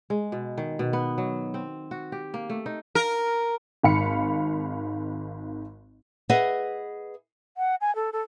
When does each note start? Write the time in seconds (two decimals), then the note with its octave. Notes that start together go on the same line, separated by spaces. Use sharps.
0.10 G#3
0.32 B2
0.58 D#3
0.79 B2
0.93 B3
1.18 F#3
1.54 C4
1.91 F#4
2.12 G4
2.34 A#3
2.50 A3
2.66 D#4
2.95 A#4
3.83 G#1 G#2 F5 B5 C#7
6.29 G#4 B4 D#5 E5 F#5
7.57 F#5
7.81 G#5
7.95 A4
8.13 A4